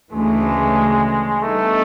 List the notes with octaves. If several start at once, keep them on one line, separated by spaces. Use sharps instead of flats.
D2 C#3 E3 G#3 A3
D3 G3 A3 B3 D#4